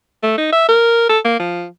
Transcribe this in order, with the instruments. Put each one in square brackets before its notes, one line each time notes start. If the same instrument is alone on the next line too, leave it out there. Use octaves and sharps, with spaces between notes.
[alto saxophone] A3
D#4
E5
A#4
A4
A#3
F3